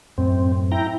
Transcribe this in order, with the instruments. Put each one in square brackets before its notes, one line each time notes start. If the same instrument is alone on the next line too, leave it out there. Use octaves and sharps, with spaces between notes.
[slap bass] F#2 A2 [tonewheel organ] C4
[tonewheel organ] E4 G5 A#5